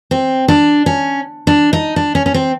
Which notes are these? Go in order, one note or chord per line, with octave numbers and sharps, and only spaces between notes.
C4
D4
C#4
D4
D#4
D4
C#4
C#4
C4